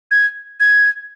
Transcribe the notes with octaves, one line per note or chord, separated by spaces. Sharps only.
G#6
G#6